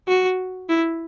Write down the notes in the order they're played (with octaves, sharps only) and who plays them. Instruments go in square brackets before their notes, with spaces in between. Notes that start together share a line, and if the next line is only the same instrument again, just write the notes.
[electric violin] F#4
E4